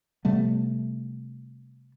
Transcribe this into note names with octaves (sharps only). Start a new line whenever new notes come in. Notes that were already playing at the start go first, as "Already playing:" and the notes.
C3 G3 A3 B3